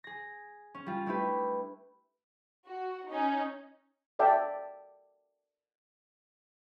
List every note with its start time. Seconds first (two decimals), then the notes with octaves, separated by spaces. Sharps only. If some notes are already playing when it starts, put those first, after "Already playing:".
0.04 G#4 A#6
0.75 C#4
0.86 G3 F4
1.06 A3 D4 E4 G4 B4
2.66 F#4
3.10 C#4 D#4
4.19 F#4 A4 D5 E5 G5 A5